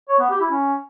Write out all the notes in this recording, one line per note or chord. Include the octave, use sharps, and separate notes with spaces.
C#5
B3
G4
E4
C#4